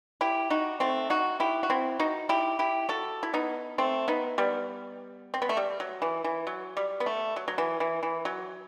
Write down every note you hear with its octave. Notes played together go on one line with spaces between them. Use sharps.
E4 G4
D#4 F#4
A3 C4
D#4 F#4
E4 G4
F#4
C4 E4
D#4 F#4
E4 G4
E4 G4
F#4 A4
E4
B3 D#4
A3 C4
B3 D#4
G3 B3
C4
B3
A3
G3
F#3
E3
E3
F#3
G3
B3
A3
F#3
F#3
E3
E3
E3
F#3